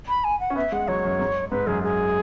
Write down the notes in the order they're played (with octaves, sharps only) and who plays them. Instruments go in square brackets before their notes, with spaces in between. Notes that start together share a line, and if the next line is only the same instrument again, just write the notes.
[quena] B5
G#5
F#5
[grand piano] C#4
[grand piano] B3 [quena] E5
[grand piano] G#3 [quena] F#5
[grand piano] F#3 [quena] C#5
[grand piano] F#2
G#2
[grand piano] G#2 [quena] B4
[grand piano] F#2 [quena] G#4
[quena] G#4